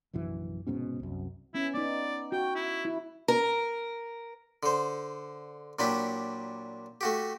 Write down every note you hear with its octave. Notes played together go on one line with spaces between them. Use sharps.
F1 A#1 F#2 E3
F1 G#2 B2 C#4
C2 F#2
B3 C#4 E4
B3 D#4 D5
F#4 G5
E4
E4
A#4
D3 C5
A#2 F#3 D4 E4 G4
A3 F#4 G4